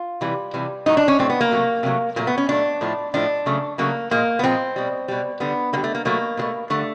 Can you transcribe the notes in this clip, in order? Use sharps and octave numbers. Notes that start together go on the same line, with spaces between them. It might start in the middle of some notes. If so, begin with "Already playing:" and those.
Already playing: F4
C3 E3 G3
C3 E3 G3
A2 F#3 A3 D#4
D4
C#4
A2 F#3 A3 C4
B3
A#3
C3 D#3 F#3 A3
C3 D#3 F#3 A3
A#2 F#3 A3 A#3
B3
C#4
A#2 F#3 A3 D4
A2 F3 A3
A2 F3 A3 D4
C#3 F#3 A3
C#3 F#3 A3 A#3
A#2 F3 G#3 A#3
B3
A#2 F3 G#3 C4
B2 G3
B2 G3
D3 G3 B3
D3 G3 A#3
A3
A#3
B2 F#3 A3 A#3
B2 F#3 A3
D3 G3 A3